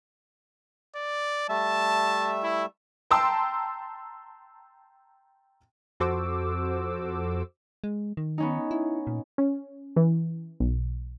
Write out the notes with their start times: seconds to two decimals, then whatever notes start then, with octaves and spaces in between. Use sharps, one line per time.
0.96 D5
1.49 G3 A3 E5 A5
2.43 E4
3.11 G5 A5 A#5 C6 E6
6.00 F2 F#4 A4 C5 D6 E6
7.84 G#3
8.17 D#3
8.38 B3 C#4 D#4
8.71 E4
9.07 A#2
9.38 C#4
9.96 E3
10.60 B1